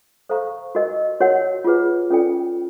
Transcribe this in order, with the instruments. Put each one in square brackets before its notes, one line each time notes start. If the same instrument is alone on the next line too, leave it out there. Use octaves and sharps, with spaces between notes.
[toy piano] A4 C5 F5 A#5 C#6
F#4 A#4 D#5
F#4 A#4 C#5 F#5
F4 G#4 B4
C#4 F4 A4 D5 G5